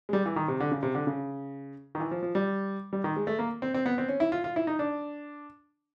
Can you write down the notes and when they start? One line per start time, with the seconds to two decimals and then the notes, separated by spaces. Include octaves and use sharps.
0.09 G#3
0.13 G3
0.26 E3
0.36 D#3
0.48 C3
0.60 D3
0.72 C#3
0.83 C3
0.95 D3
1.07 C#3
1.95 D#3
2.00 E3
2.11 F3
2.23 F3
2.35 G3
2.93 G3
3.04 D#3
3.17 G#3
3.27 A3
3.39 A#3
3.62 C4
3.74 C4
3.86 B3
3.98 C4
4.08 C#4
4.20 E4
4.32 F4
4.44 F4
4.56 E4
4.67 D#4
4.79 D4